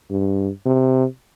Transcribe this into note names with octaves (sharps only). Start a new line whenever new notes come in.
G2
C3